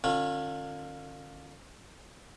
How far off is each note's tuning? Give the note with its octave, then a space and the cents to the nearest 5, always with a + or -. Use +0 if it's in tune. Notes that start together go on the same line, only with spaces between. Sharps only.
D3 +45 C#4 -30 F4 +20